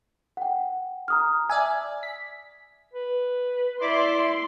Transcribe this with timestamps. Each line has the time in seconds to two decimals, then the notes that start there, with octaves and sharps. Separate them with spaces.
0.37 F#5 G5
1.08 A#5 D#6 F6
1.50 D5 E5 G#5
2.03 B6
2.94 B4
3.82 E4 D5 C6